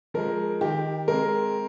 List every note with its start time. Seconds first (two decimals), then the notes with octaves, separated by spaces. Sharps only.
0.14 F3 G#3 A#4
0.61 D#3 G4
1.08 G#3 C4 A#4